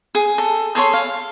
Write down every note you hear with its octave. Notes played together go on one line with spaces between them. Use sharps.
G#4
A4
G#4 A4 C#5 C6
F5